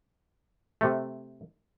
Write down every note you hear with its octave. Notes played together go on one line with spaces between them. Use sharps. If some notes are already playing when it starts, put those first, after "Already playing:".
C3 A3